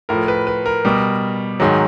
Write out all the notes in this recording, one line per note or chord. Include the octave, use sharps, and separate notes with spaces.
A2 F3 A#4
B4
B4
A#4
B2 G3
G#2 D#3 F#3